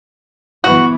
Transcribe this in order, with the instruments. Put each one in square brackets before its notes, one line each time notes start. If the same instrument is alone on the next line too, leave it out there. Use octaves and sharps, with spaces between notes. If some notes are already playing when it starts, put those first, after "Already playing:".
[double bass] E3 B3 [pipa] F#4